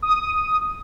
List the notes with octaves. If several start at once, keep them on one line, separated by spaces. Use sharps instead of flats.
D#6